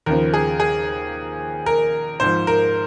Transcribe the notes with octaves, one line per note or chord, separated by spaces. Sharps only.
D#2 C#3 F3 A#4
G#4
G#4
A#4
G#2 F3 C5
A#4